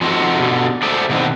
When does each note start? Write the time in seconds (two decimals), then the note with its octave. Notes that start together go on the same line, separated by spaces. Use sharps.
0.01 F3 C4 D#4 F#4 A4
0.39 B2 D3
0.83 G#4 A4 C5 D5 E5
1.09 B2 D#3 F#3 C4